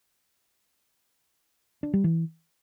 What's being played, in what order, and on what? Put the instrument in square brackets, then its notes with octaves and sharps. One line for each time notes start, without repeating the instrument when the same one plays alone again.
[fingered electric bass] D4
G3
E3